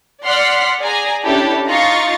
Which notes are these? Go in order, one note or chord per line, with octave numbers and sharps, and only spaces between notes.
D5 F#5 C6 F6 B6
G#4 D5 G#5 A#5
C#4 D4 E4 G4 A4 A5
D#4 F4 A#5 C#6 A6 C7